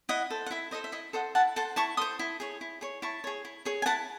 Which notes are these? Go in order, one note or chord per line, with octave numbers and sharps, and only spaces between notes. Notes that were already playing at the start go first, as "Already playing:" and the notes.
E4 D#5 F#5
A4 C5
F#5
E4 E5
A4 C5 D#5
E5
E4 D#5
A4 C5 D#5 F#5
E4 F#5 A5
A4 C5 F#5 A5
E4 A5 C#6
A4 C5 C6 D#6
E4
G#4 C#5
E4
G#4 C#5
E4 A5 C#6
G#4 C#5
E4
G#4 C#5
G#5
E4 F#5 A5